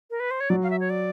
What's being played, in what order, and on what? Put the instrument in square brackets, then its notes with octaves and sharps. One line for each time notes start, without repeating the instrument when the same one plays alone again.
[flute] A#4
B4
C5
C#5
[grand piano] F#3 [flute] D5
[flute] F5
E5
C#5
D5